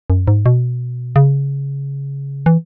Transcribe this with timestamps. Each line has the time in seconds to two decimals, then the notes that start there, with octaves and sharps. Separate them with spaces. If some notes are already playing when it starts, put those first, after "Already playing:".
0.10 F#2
0.28 G#2
0.46 B2
1.16 C#3
2.46 E3